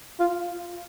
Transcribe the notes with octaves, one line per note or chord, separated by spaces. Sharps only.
F4